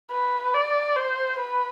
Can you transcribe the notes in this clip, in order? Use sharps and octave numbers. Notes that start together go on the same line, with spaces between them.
B4
D5
C5
B4